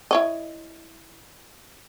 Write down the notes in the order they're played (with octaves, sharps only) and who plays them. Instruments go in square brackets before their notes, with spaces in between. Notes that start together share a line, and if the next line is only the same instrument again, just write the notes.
[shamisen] E4 C#5 D#5